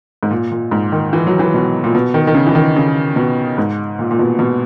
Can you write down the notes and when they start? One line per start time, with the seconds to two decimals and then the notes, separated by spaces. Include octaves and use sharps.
0.23 G#2
0.31 A#2
0.52 A#2
0.71 G#2
0.92 D#3
1.13 E3
1.27 F#3
1.39 E3
1.54 B2
1.84 A#2
1.95 B2
2.14 D#3
2.27 D#3
2.34 C#3
2.47 E3
2.55 D#3
2.76 C#3
3.16 B2
3.58 G#2
3.99 A#2
4.11 A#2
4.19 B2
4.39 B2